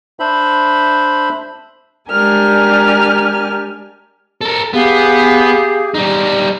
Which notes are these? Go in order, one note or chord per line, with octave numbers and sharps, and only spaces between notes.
D4 C5 E5 B5
G#3 D4 G4 A#4 G#5 F6
A4 A#4
B3 G4 G#4 F5
G3 D#4